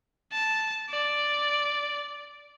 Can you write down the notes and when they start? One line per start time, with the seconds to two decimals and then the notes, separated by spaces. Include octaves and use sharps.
0.32 A5
0.90 D5